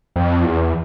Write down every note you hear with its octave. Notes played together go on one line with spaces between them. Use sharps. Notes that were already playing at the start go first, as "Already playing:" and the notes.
F2
E2